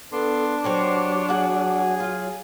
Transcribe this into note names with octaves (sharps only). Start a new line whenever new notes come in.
B3 D4 A4 C6
F#3 F#4 G4 C5 C#5 C6
F#4 G#4 F#5
F4